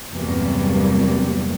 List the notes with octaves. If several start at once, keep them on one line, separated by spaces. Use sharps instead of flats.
E2 G2 C3 F#3 G3 A#3